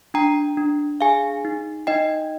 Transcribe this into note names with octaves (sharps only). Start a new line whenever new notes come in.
D4 G5 A#5
D4
G#4 F5 G#5
D#4
D#4 D#5 G5